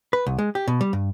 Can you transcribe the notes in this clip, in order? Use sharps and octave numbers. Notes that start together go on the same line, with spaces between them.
B4
C2
G#3
G4
B2
G3
G2